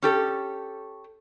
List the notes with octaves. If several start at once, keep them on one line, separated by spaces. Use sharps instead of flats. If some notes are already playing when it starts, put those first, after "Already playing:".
C#4 G4 A4